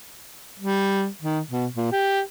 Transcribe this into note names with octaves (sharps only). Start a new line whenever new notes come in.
G3
D#3
B2
A#2
G4